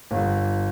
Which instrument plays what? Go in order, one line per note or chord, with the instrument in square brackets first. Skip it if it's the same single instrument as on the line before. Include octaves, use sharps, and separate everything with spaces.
[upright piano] G1